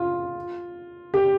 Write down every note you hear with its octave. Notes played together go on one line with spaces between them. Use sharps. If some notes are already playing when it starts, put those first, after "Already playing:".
Already playing: F4
G4